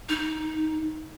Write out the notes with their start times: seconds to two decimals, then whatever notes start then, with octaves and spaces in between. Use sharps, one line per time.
0.09 D#4